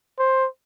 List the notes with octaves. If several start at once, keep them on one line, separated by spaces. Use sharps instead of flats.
C5